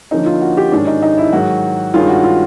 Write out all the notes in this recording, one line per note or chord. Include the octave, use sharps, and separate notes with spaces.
D3 F3 A#3 C#4 D#4
F4
F#4
G4
G#2 D#3 G#3 C#4 D4
D#4
D#4
E4
G#2 D#3 F#3 F#4
G2 D#3 G#3 C#4 F4
F#4
F4